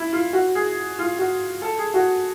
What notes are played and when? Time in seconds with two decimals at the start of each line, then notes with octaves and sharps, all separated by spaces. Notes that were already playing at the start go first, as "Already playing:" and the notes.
Already playing: E4
0.13 F4
0.33 F#4
0.55 G#4
0.99 F4
1.19 F#4
1.62 A4
1.79 G#4
1.94 F#4